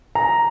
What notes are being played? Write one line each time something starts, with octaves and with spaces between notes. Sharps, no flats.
A#5